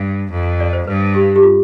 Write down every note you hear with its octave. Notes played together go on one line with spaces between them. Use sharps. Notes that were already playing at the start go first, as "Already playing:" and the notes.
Already playing: G2
F2
D5
C5
G2 B4
G4
G4
F4